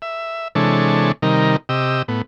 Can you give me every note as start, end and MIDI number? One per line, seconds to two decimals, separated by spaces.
0.02 0.48 76
0.55 1.12 48
0.55 1.12 52
0.55 1.12 56
0.55 1.12 62
0.55 1.12 69
0.55 1.12 73
1.22 1.56 48
1.22 1.56 51
1.22 1.56 55
1.22 1.56 63
1.22 1.56 70
1.69 2.02 48
1.69 2.02 67
1.69 2.02 75
1.69 2.02 88
2.08 2.22 45
2.08 2.22 59